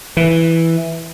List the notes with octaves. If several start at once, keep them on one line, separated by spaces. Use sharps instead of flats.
E3